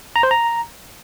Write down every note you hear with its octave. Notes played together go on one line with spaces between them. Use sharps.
A#5
C5
A#5